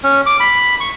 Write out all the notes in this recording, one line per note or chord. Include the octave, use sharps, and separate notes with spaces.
C#4
D6
B5
C#6